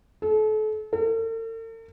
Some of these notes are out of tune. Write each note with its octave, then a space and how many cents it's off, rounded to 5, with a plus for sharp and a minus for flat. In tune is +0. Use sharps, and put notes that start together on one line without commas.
A4 -35
A4 +45